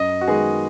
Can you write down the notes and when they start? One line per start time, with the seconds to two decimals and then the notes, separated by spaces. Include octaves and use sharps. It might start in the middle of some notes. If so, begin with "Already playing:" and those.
Already playing: F#2 D#5
0.21 F#4
0.28 D#3 G#3 B3 G#4